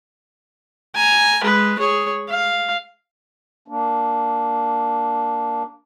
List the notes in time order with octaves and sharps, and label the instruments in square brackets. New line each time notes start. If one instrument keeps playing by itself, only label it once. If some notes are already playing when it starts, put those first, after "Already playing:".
[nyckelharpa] G#5 A#5
G#3 B4
G#4 C#5
F5
[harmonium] A#3 D4